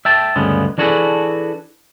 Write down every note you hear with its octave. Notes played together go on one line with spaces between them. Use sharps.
E5 G5 A5
D2 G2 C#3 G3 G#3 B3
E3 D4 F#4 G#4 A4 B4